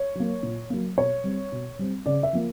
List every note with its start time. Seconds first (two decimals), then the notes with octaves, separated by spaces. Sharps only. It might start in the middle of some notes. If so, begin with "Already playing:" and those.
Already playing: C#5
0.15 F#3 A#3
0.43 A#2
0.70 F#3 A#3
0.98 B2 C#5
1.24 G3 C4
1.52 B2
1.79 G3 C4
2.06 C#3 D5
2.23 E5
2.33 F3 A#3